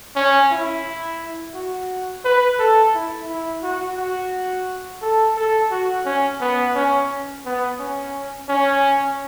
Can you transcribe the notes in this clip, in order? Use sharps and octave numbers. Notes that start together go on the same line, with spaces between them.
C#4
E4
F#4
B4
A4
E4
E4
F#4
F#4
A4
A4
F#4
C#4
B3
C#4
B3
C#4
C#4